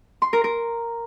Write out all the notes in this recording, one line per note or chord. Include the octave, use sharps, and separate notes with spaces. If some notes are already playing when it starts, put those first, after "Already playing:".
C6
A#4
A#4